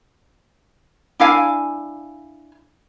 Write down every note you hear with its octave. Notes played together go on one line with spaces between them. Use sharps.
D4 E4 F5 G#5